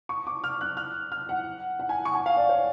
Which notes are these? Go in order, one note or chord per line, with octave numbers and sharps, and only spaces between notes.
C#6
D6
F6
F#6
F6
F6
F#5
F#5
G#5
C#6
G#5
F5
D5
C#5